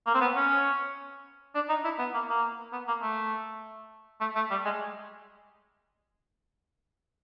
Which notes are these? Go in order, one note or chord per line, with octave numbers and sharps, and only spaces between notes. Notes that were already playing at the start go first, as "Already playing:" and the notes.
A#3
C4
B3
C#4
D4
D#4
E4
B3
A#3
A#3
B3
A#3
A3
A3
A3
G3
G#3